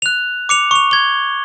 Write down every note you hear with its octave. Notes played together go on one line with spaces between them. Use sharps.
F#6 F7
D6 C#7 F7
C#6 F7
G#6 G7